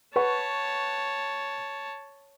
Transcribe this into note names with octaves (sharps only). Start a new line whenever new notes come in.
B4 C#5 F#5 A5 C#6